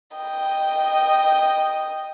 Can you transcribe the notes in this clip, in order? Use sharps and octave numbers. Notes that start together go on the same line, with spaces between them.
D#5 G5